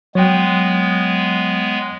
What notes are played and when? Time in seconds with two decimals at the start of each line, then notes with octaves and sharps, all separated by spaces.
0.15 F#3 G#3 B3 C#5 G5